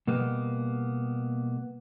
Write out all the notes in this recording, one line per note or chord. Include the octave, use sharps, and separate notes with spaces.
B2 G3 A#3 B3